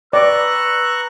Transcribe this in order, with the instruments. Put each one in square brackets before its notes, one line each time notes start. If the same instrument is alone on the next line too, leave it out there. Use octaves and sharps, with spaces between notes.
[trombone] B4 [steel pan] D5 [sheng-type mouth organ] A#5 C#6 F#6 [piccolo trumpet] E6